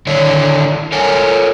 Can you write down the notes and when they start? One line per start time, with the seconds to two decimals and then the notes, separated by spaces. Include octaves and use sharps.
0.07 D3 D#3 D4 E4 C#5
0.92 A4 A#4 C#5 G#5